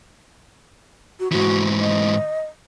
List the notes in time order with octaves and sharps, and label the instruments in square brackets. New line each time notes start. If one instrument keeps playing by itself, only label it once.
[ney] F#4
[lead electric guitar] G#2 E3 [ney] F#4
[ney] D#5